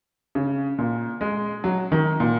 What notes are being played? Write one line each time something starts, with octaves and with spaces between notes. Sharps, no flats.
C#3
A#2
G#3
F#3
D#3
A#2